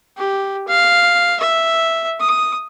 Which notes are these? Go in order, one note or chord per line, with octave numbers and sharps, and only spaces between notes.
G4
F5
E5
D#6